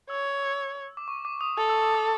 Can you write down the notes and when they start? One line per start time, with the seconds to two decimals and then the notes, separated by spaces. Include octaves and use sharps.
0.10 C#5 E6
0.97 D6
1.08 C#6
1.25 D6
1.41 D#6
1.57 A4 D#6
1.70 E6
1.82 E6
1.95 D#6